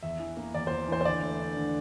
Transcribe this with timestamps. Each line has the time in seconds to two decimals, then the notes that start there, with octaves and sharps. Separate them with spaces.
0.03 E2 E5
0.19 E3
0.37 A#3
0.54 E2 D5
0.67 C5
0.71 E2
0.88 E3 C5
1.01 C5
1.05 D3 D5
1.22 A3
1.39 D4
1.57 D3